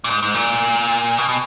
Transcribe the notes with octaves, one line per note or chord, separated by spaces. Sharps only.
A#2
G#2
G#2
A#2
B2
B2